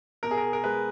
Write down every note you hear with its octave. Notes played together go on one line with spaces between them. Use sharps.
B2 A#4
G#4
A#4
A#4
G#3 B4